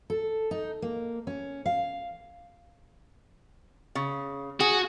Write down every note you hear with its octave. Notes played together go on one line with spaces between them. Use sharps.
A4
D#4
A#3
C#4
F5
C#3
F#4 G#4